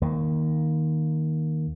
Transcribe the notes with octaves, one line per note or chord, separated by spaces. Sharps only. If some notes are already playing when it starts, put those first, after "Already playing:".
D#2 D#3